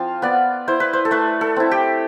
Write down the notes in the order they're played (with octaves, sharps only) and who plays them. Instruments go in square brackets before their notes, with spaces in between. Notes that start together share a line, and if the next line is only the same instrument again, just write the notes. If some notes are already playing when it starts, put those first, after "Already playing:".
Already playing: [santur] F3 C4 F4 F5
B3 D5
E4 C5
B4
C5
A4
A3 B4
A4
C4 E4
G4